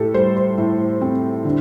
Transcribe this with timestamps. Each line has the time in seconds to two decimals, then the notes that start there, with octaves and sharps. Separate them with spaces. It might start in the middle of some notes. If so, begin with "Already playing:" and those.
Already playing: A2 G4 A4
0.14 G3 C5
0.37 C5
0.58 A2
1.01 C4
1.45 D3